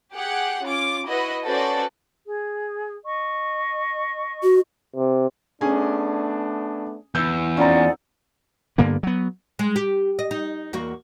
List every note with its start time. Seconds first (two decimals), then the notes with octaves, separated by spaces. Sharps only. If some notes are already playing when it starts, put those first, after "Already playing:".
0.14 G4 G#4 F#5
0.62 C#4 F4 D6
1.07 E4 F#4 B4 D#5
1.45 C#4 F#4 A4 B4 C5 D5
2.25 G#4
3.05 D#5 C#6
4.43 F#4
4.96 C3
5.61 A3 B3 C#4 D4 G#4 G#5
7.15 E2 E6 G6
7.57 F2 C#4 D#4 F4 D5 F#5 G#5 A#5
8.78 G2 D3 A#3 B3
9.03 F#3 B3
9.59 G#3
9.76 G4
10.19 D#5
10.31 D#4
10.73 E2 A#3 F#4